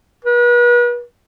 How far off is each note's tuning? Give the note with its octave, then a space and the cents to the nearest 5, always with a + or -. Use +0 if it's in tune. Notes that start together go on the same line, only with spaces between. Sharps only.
B4 -40